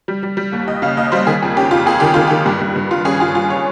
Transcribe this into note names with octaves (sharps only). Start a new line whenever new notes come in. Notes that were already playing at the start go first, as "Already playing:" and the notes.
G3
G3
G3
D#2
D#2 D#5
C#3 F5
D#2 D#5
G3 C5
D#3 G#4
F2 G#4
C#4 G4
F2 F4
F2 G#4
D#3 G4
D#3 F4
D#3 G4
G2
G2
G2
F4
C#4 G#4
F4 G#4
F4
C#5